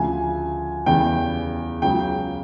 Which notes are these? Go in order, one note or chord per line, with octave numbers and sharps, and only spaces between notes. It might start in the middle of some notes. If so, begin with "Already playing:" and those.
Already playing: D2 C#3 F3 G#5
E2 C#3 E3 G3 G5
C#2 C#3 F#3 G5